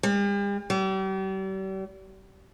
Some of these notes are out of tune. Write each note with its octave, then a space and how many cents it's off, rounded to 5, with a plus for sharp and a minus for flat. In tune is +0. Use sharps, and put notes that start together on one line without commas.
G3 +45
G3 -40